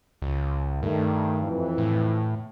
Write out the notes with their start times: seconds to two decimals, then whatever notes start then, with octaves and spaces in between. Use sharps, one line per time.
0.22 C#2
0.83 G2 D#3 A3
1.44 F2 E3
1.78 A2